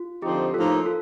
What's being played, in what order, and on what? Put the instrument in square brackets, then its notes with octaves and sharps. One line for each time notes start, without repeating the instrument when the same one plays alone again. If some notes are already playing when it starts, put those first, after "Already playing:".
Already playing: [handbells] F4
[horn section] D3 F3 C4 D#4 [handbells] G4
[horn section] A2 F3 A#3 D#4 [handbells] F4 A4
[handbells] F4 A4